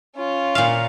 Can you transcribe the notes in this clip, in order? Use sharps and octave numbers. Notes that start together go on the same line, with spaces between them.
C#4 F4
A#2 F5